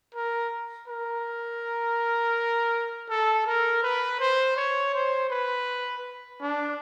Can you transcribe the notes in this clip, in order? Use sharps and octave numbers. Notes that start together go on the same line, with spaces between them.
A#4
A#4
A4
A#4
B4
C5
C#5
C5
B4
D4